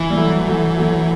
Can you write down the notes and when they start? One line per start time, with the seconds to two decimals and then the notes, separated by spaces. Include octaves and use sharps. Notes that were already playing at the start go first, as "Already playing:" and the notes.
Already playing: E3
0.10 G3
0.17 F#3 A3
0.48 F#3 A3
0.78 F#3 A3